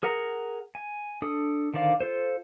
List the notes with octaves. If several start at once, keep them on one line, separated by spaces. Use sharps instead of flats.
G#4 A#4 F#5 A#5
G#5
D4 A4 D#6
D3 D#3 C5 D5 F5
F4 A4 C5